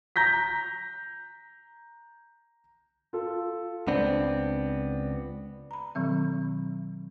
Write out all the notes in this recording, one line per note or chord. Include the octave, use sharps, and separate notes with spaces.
A#5 G6 A#6 B6
F4 A4
C#2 B3 C4 D4
A#5 B5
B2 D#3 F#3 C4